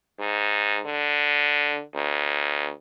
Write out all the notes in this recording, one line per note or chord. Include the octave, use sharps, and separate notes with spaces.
G#2
D3
D2